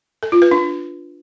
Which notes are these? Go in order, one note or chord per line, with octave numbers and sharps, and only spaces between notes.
A4
F4
B4
D4